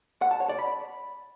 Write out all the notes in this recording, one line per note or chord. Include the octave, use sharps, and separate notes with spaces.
F#5
A5
C#5
D5
B5